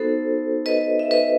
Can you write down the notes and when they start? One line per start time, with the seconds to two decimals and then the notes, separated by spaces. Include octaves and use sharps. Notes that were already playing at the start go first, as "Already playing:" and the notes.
Already playing: B3 D#4 F#4 A4 C5
0.66 B4 D#5
0.99 E5
1.11 B4 D#5